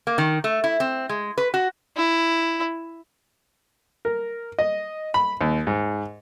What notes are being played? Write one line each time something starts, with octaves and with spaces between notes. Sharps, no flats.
A#3
D#3
A3
E4
C4
G#3
B4
F#4
E4
A#4
D#5
B5
D#2
G#2